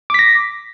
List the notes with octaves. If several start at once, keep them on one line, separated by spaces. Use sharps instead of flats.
D6 A#6 B6